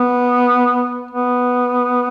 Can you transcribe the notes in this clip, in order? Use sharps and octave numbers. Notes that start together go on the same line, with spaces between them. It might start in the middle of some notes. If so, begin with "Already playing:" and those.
Already playing: B3
B3